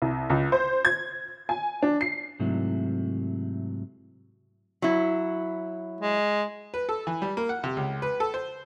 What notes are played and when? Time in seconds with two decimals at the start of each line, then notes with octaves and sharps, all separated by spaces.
0.02 C2
0.30 C#2
0.52 C5
0.85 G#6
1.49 G#5
1.82 D4
2.01 C7
2.39 G#2 C3 F#3 A3 E4
4.82 F#3 E4
6.01 G#3
6.74 B4
6.89 A4
7.07 E3
7.22 G3
7.37 A#3
7.49 F#5
7.64 C3
7.77 C#2
8.02 B4
8.20 A4
8.34 C5